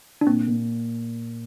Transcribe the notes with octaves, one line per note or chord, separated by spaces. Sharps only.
D4
A#2 C4
A#2